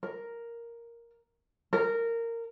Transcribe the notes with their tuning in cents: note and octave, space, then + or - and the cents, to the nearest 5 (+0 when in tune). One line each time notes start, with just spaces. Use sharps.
A#4 +0
A#4 -15